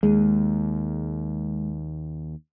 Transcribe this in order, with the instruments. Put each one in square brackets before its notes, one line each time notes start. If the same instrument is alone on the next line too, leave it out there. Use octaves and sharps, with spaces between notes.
[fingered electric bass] D#2 [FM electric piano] G#3